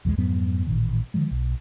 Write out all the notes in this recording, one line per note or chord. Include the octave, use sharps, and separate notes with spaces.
B1 E2 D#3 G#3
F2 G#2 F#3 B3
A1 A#2 D#3
D3 D#3 F3 G#3
B1